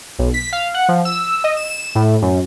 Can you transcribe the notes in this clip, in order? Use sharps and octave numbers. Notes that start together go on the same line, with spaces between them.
B1
B6
F5
F#5
F3
E6
D#5
E7
A2
F#2